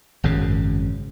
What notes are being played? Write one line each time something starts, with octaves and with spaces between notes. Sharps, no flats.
G#1 F#2 C#3